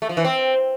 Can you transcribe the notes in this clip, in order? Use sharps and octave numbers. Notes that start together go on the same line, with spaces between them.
A3
F3
E3
C4